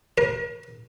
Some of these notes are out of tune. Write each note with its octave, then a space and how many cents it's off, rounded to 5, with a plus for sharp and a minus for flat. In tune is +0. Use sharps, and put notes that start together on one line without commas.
A#4 +40